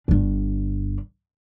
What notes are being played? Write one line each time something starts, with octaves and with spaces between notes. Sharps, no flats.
G1 D4